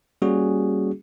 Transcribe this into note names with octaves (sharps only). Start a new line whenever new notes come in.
G3 A#3 C#4 F#4 G#4